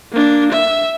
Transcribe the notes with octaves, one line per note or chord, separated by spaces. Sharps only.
A#3 D4
E5